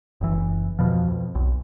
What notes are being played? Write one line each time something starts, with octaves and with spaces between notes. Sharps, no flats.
F#1 E3
F2 B2 F3
F2
B1